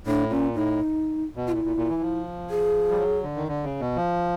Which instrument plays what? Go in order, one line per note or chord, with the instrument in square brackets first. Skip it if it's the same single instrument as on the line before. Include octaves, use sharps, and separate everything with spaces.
[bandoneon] A2 [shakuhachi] D4
[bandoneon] A#2 [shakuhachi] C#4
[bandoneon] A2 [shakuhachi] D#4
[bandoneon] B2
[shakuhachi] F4
[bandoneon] A#2 [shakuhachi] E4
[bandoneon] A#2
A#2
E3
F3
[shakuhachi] G#4
[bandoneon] G3
F#3
D3
D#3
D3
C#3
B2
F3